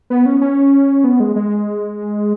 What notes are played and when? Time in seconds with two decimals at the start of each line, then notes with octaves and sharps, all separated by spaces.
0.10 B3
0.26 C#4
0.41 C#4
1.04 B3
1.20 G#3
1.36 G#3